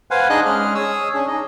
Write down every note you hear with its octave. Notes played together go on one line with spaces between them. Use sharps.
B4 C5 F5 F#5 G#5
D4 D#4 G#4 D#5 G#5 F#6
G#3 C#4 G#4 F6
G#4 C#5 D#6 E6
C#4 D4 G#4
D#4 D#5